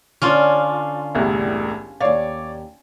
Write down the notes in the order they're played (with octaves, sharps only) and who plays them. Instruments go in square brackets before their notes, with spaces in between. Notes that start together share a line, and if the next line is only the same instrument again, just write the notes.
[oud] D3 C#5 [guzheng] C#4 D4 F4
[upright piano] E1 C2 A2
[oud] D#2 F5 [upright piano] C#5 D5